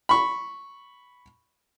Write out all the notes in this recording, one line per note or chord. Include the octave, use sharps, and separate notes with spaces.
B5 C#6